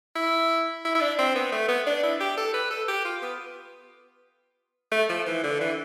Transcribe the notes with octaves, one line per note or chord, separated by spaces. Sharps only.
E4
E4
E4
D4
C4
B3
A3
B3
D4
E4
G4
A4
B4
A4
G4
F4
B3
A3
F3
E3
D3
E3